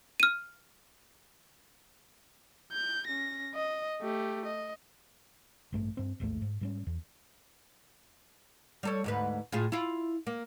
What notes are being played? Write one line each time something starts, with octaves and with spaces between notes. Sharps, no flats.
F6 D#7
G6
C#4 A#6
D#5
A3 G4
D#5
A1 G2 A3
G2 C4
A1 D#2 G#2 A3
G#2
G#2 G3 C#4
E2
G3 A4 C#5
D2 G#2 B4
A2 F4 G#4
E4 F4
A#3